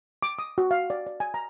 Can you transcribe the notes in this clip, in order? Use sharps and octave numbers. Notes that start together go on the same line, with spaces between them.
D6
D#6
F#4
F5
D5
D5
G#5
A#5